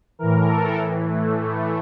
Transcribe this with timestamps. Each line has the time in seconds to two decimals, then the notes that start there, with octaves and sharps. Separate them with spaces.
0.19 A2 E3 A#4
0.48 A4
0.76 A2 E3
1.06 A3
1.35 A2 E3